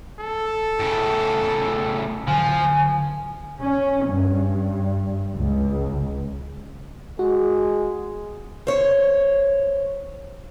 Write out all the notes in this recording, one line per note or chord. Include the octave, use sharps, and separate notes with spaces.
A4
A2 C#3
D3 F3 F#3 G#5
C#4
G2
C#2
G#3 F#4
C5 C#5